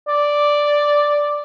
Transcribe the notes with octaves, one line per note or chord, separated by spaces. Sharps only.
D5